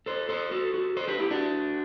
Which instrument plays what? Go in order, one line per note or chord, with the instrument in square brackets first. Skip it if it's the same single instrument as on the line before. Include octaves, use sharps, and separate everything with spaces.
[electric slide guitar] A4 C5
A4 C5
F#4 A4
F#4 A4
A4 C5
G4 B4
E4 G4
D4 F#4